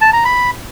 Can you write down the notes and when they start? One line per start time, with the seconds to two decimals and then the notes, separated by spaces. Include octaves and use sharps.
0.01 A5
0.13 A#5
0.25 B5